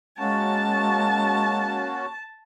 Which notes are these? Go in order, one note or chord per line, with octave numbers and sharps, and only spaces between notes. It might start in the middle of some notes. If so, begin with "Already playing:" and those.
G#3 A#3 C#4 F#4 A5